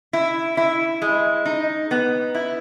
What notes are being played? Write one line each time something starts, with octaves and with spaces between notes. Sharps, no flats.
E4
E4
G#3
D#4
B3
E4